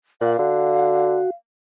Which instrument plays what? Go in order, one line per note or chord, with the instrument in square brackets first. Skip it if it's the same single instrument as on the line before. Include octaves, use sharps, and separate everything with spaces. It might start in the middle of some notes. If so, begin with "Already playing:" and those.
[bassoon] A#2 [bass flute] F5 [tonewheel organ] F#5
[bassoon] D3 [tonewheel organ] F#4